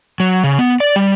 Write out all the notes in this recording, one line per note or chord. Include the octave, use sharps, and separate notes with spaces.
F#3
C#3
B3
D5
G3